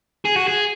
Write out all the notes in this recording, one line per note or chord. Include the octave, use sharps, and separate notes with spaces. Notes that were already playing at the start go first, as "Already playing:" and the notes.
G#4
F#4
G#4